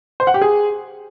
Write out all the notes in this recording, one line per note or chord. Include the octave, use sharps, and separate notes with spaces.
C5
F#5
G4
G#4